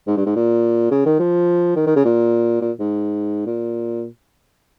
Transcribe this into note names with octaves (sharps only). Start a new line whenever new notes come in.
G#2
G2
G#2
A#2
C#3
D#3
F3
D#3
D#3
C#3
A#2
A#2
G#2
A#2